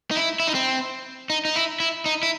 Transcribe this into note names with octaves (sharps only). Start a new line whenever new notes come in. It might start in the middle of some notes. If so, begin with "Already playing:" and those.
D#4
E4
E4
D#4
C4
D#4
D#4
E4
E4
D#4
E4